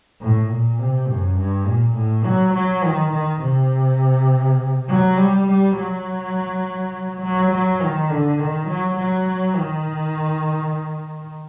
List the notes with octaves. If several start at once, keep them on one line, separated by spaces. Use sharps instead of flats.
A2
A#2
C3
F#2
G2
A#2
A2
F#3
F#3
D#3
D#3
C3
F#3
G3
G3
F#3
F#3
F#3
D#3
D3
D#3
F#3
F#3
D#3